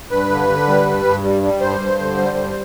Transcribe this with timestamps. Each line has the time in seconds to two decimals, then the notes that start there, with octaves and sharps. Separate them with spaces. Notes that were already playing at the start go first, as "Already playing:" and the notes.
0.10 G2 B4
0.30 D3
0.48 D3
0.67 G3
0.86 G2
1.05 G2
1.23 G3
1.43 G3
1.61 G2 C5
1.80 G2
1.99 D3
2.17 G3
2.37 G2